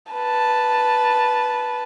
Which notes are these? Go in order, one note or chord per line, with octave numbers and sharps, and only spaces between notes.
B4 A5